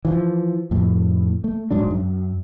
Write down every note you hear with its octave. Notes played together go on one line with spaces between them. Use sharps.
E3 F3
F2 A2
A3
D1 G#2 F#3 D4
F#2